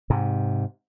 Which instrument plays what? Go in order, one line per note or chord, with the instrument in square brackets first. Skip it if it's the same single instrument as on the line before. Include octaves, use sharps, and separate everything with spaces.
[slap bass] G#2 C3